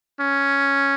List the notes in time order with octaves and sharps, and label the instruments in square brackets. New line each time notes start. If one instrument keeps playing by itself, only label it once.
[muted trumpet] C#4